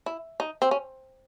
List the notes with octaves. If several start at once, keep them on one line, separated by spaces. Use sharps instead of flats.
E4
D#4
C4
C#4